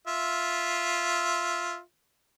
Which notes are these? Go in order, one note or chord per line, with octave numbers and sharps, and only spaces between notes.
F4 E5